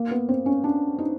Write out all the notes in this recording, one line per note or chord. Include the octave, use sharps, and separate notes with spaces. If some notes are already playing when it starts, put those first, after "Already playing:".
Already playing: A#3
B3
C4
C#4
D4
D#4